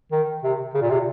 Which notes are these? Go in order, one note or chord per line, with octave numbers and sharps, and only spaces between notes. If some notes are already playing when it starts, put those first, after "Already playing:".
D#3
C3
C#3
A#2
C3